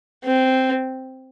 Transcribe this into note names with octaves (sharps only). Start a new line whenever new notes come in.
C4